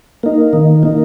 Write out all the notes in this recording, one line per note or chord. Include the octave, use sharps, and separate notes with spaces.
A#3 D#4
D#3
A#3 D#4